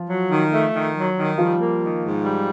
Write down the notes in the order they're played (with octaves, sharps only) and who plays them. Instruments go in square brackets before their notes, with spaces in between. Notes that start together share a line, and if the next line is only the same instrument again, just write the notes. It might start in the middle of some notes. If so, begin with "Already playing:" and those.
Already playing: [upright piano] F3 F4
[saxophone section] F#3
D#3
A3
D#3
F#3
D#3
[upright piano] F3 F4 [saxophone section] G3
[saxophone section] A#3
D#3
G#2
G3